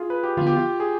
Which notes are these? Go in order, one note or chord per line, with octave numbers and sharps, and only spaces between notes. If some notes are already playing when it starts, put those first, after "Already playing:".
Already playing: F4 G#4
B4
G4
D3 F3 B3 F4
G4
F4
G#4